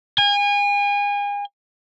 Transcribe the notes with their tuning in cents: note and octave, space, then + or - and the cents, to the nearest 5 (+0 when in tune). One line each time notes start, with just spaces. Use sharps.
G#5 -35